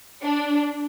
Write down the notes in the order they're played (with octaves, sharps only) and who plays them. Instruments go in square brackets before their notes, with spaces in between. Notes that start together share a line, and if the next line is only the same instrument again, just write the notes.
[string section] D4